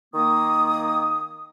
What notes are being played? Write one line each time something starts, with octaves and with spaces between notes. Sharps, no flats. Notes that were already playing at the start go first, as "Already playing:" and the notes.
D#3 A#3 D#6